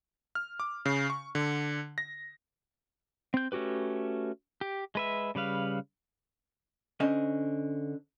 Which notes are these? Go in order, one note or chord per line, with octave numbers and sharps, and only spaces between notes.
F6
D6
C#3
C#6
D3
A#6
C4 G6
A3 C#4 F#4 G4 B4
G4
G#3 B4 E5
C#3 G3 B4 F5
D3 C#4 C5 D#5